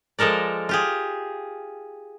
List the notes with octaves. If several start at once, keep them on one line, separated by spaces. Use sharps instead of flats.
F3 G#3 A4 A#4 D5
F4 G4 G#4